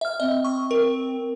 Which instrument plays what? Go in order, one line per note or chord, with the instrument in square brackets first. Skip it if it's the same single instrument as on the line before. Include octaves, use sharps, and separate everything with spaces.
[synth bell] E5 F6
[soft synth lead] C4 [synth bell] D#5
[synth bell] C#6
A#4